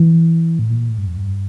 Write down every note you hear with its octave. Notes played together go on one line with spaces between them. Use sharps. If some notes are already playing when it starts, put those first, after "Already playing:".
Already playing: E3
A2
A#2
A2
G2
F2
G2